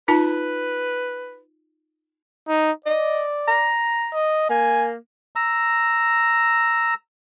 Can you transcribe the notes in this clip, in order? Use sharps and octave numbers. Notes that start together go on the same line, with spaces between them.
D#4 F4 B4 A5
D#4
D5 D#5
A#5
D#5
A#3 G#5
A#5 E6